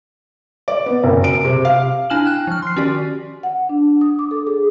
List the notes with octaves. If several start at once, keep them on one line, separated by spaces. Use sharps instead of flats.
D5
B3
F#1
D7
C3
F5
D4 E4 G#5 F6 E7 F#7
G5 F#6
F3 F6
C6 C7
D#3 C#4 F#4 G4 D5
F#5
D4
D#6
D6
A4
G#4